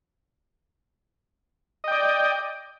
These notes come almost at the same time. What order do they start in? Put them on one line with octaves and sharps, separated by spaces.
D#5 G5 D5